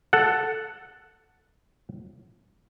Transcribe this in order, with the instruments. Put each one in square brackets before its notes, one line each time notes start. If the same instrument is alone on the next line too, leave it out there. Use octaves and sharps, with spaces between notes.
[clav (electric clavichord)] A4 F#5